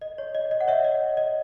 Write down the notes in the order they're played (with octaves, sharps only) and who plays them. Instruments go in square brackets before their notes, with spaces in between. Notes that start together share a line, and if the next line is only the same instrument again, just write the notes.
[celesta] D#5
C#5
D#5
D#5
F#5
C#5 E5
D#5
D#5